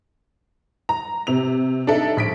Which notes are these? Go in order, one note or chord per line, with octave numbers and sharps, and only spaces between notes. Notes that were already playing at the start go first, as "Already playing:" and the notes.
A#5
C3 F7
D4 D#4 A4 E5
A#1 B6 D7